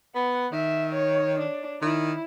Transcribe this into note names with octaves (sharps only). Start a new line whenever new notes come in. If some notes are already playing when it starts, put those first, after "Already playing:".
B3 F#5
D#3 E5
C#5
D4
D#3 E4